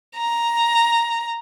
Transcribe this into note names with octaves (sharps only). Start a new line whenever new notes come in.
A#5